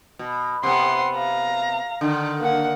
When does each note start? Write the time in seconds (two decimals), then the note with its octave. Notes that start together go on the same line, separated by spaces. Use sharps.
0.19 B2
0.63 C3 B3 F#5 C6
1.15 F5 A#5
2.01 D3 D#3
2.40 A#3 F#5